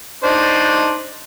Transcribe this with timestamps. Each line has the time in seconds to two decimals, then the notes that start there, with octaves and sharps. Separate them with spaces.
0.24 D4 D#4 C5